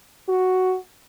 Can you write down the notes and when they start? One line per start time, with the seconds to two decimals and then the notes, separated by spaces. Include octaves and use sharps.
0.29 F#4